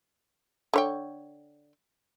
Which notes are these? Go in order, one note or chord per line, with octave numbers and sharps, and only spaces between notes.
D3 C#5 G5